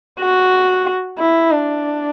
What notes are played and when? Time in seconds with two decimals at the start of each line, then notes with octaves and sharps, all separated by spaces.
0.20 F#4
1.19 E4
1.51 D4